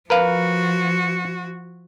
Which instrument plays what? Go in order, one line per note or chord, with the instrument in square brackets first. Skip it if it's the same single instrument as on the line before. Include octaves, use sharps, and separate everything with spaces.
[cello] F3 F#4 [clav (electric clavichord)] A#4 B4 F5